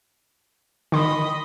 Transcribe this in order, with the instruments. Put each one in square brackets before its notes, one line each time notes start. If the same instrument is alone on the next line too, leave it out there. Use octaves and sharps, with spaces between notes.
[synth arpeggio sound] D#3 C6 [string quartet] D#5 B5